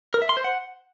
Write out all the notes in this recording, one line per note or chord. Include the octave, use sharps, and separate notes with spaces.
A#4
E5
C6
C5
F#5